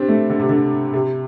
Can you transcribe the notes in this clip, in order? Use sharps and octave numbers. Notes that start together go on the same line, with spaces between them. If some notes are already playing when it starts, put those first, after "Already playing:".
Already playing: G3 C4 D4
A3
D3
C3
D3
C3